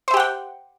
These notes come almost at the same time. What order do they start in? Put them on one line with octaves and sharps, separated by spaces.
C5 E5 G4 F#5 G5